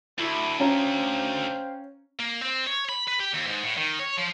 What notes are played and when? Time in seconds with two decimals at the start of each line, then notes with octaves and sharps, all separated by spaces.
0.19 D2 E4
0.60 C#4 C5 F5 G5 A#5
2.19 A#3
2.41 C4
2.67 C#5
2.89 B5
3.08 B4
3.19 G4
3.34 D#2
3.47 G#2
3.63 A2
3.77 D#3
4.00 C#5
4.18 F3